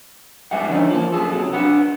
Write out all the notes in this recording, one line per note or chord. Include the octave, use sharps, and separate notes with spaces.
G#2 G3 E5 F#5
D3 E3 F3 C#4 D#4
F3 A#3
F#2 G#4 A4
C3 F#3
D4 B4 F#5